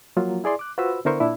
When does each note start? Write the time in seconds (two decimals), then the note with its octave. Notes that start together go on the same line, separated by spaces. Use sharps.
0.16 F3 F#3 A#3 F4
0.44 E4 G#4 D5 C6
0.59 D6 F#6
0.78 F4 F#4 B4 C5 B5 E6
1.05 D3 B3 E4 A#4 C5 C#6
1.20 A#2 D4 E4